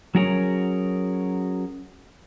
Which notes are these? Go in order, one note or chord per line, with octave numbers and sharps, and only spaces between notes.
F#3 C#4 F#4 G#4 A#4 C#5